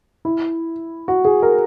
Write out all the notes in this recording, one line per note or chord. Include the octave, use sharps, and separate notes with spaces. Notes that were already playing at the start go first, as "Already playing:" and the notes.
E4
F#4
G#4
A#4